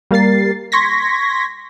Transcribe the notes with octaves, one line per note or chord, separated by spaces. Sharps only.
G3 A#3 A#4 A6 C7
C6 C#6 G#6 A#6 B6